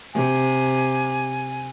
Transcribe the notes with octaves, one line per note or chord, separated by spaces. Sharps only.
C3 G#5